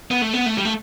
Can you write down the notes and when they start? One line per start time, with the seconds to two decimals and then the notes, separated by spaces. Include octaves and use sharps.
0.11 B3
0.22 A3
0.33 B3
0.46 A3
0.58 G3
0.65 A3